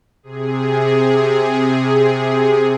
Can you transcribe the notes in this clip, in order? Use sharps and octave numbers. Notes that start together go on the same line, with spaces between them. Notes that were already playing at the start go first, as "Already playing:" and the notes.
C3 G#4